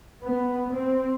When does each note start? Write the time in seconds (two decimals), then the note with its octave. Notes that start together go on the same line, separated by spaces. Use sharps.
0.23 B3
0.73 C4